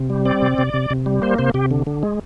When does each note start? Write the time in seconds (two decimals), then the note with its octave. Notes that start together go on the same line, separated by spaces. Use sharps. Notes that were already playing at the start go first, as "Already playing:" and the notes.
Already playing: C3
0.10 G3
0.25 C4 D5
0.42 C3
0.58 C3
0.74 C3
0.90 C3
1.06 G3
1.22 A#3 C5
1.38 C3 C5
1.54 C3 G4
1.71 D3
1.87 D3
2.03 G#3